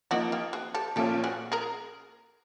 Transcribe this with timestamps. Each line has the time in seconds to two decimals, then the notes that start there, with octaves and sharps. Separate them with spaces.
0.11 F3 A#3 D#4 E4 F#4
0.32 F4 G4
0.53 F#4 G#4
0.74 G4 A4
0.96 A#2 F3 A#3 C#4 F4 G4 A4
1.24 F#4 G#4
1.52 G#4 A#4